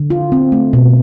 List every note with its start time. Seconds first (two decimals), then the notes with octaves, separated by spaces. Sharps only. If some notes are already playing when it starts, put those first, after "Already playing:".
Already playing: D3
0.10 F4
0.32 C4
0.52 A3
0.73 B2